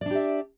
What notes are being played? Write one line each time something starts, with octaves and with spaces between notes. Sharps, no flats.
D4 G4 D5 E5